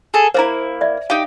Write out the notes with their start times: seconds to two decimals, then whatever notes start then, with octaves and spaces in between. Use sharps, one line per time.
0.14 G#4 A4
0.34 A#3 D4 E4 C5 A#5
0.81 D5 E5
1.10 D#4 G4 F5